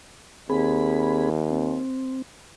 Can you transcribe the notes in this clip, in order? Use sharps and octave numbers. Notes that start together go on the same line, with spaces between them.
D#2 C4 G#4 B5
C4